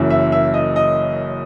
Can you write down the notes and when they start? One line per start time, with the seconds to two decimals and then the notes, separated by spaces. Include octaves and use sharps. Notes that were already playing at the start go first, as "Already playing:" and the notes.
Already playing: F#1 F#2 E3
0.10 E5
0.32 E5
0.54 D#5
0.76 D#5